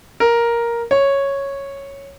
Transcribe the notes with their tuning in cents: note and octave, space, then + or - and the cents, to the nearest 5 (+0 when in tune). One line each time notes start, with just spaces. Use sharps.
A#4 +5
C#5 -5